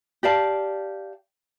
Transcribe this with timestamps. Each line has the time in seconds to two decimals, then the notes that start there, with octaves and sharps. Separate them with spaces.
0.23 G4 D5 F5 A5